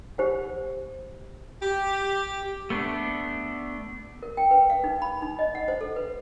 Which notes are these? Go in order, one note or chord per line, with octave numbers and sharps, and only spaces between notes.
G4 C5 F#5
G4
A3 B3 D4
A#4
G5
B4
F5
D#4
B5
D#4
D#5
F#5
C5
A4
B4